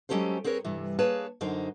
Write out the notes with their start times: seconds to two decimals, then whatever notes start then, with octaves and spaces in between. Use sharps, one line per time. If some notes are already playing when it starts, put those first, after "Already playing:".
0.09 F#3 G#3 C#4 G4 A4 C5
0.44 C4 G#4 A#4 B4 C#5
0.64 G2 C3 E3
0.99 A#3 G#4 B4 C#5 A5
1.41 F#2 D3 D#4 C5